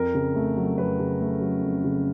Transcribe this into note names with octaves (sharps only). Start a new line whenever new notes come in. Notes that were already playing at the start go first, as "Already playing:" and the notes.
Already playing: F2 A#4
C#3
A3
F#3
F2 B4
C#3
A3
F#3
F2
C#3